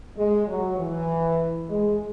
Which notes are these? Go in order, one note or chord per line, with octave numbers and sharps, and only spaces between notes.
G#3
F#3
E3
G#3